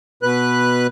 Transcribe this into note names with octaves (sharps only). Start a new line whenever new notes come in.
B2 B4 F#6